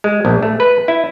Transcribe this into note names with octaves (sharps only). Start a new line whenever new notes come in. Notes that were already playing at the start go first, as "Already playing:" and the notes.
G#3
A#1
A3
B4
E4